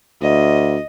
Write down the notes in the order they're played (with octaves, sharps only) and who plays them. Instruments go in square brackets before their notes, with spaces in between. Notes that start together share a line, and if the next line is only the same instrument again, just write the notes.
[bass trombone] D2 [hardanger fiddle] D#5